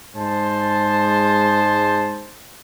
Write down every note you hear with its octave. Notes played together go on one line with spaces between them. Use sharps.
G#2 G#3 C5 A5